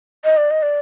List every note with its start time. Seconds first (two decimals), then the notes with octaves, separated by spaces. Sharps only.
0.25 D#5
0.37 D5
0.51 D#5
0.63 D5